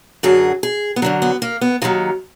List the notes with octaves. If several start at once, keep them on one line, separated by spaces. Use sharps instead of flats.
F#2 D3 F#3 G#4
G#4
B3
F#2 D3 F#3 D4
B3
A#3
B3
D#2 D#3 F#3 G#3